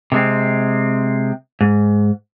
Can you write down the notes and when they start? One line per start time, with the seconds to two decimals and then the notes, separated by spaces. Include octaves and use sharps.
0.12 C3 G#3 C4
1.61 G#2